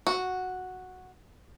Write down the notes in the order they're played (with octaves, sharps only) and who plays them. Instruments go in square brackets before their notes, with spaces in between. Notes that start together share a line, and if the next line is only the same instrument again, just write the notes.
[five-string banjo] F#4